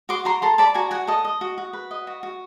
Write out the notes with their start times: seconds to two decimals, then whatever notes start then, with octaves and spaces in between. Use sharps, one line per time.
0.09 F#4 C6 D6
0.25 F#4 A#5 C6
0.42 A4 A#5 C6
0.58 D5 A5 B5
0.74 F#4 G#5 A#5
0.91 F#4 F#5 G#5
1.07 A4 D#5
1.25 D#5
1.41 F#4
1.58 F#4
1.73 B4
1.91 D#5
2.07 F#4
2.23 F#4